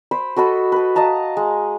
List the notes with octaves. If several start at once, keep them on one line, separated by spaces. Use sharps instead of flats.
C5 B5 D6
F#4 A4 D#5 B5
A4 B4
D#5 F5 A5 A#5
G#3